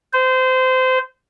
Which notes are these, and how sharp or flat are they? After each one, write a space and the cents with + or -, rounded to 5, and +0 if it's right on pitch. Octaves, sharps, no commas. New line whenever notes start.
C5 -25